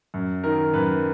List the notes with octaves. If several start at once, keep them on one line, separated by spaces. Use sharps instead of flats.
F#2
D#3 A#4
F#2 B4